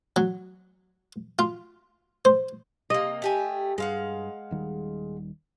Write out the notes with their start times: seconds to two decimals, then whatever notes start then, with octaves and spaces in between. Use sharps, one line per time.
0.16 F#3
1.39 F4
2.25 C5
2.90 C3 A#3 D#5
3.22 A3 G4 G#5
3.78 G2 G#3 F5 F#5
4.51 D#1 D#3 G3